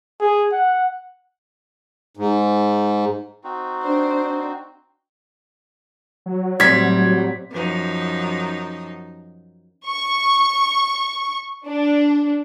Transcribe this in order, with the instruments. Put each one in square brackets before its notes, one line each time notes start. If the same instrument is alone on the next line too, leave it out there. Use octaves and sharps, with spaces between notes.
[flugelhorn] G#4
F#5
[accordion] G#2
[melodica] C4 D#4 F#4
[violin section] D4 C5
[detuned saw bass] F#3
[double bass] A2 C4 [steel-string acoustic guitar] G3 [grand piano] G#6 B6
[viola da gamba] F#2 F3 D#4
[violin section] C#6
D4